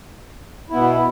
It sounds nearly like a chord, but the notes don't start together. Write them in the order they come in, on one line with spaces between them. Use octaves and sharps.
E4 B3 B2